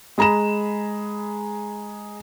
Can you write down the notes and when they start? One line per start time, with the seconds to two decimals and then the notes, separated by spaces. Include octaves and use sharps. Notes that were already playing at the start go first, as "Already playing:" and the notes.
0.18 G#3 G#4 A#5 B5 E7